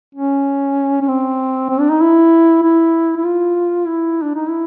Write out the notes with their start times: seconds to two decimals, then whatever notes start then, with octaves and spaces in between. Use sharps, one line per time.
0.15 C#4
1.02 C#4
1.08 C4
1.69 C4
1.80 D4
1.90 D#4
2.01 E4
2.62 E4
3.17 E4
3.25 F4
3.86 E4
4.22 D4
4.35 D#4
4.48 E4